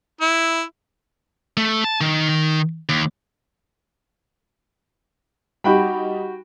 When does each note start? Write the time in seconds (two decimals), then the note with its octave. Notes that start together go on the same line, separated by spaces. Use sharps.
0.21 E4
1.57 A3
1.84 A5
2.01 D#3
2.89 D#2
5.64 G3 D#4 F#4 G4 G5 B5